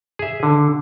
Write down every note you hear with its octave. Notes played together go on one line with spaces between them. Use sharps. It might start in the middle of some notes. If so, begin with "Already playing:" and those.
G#4 E5
D3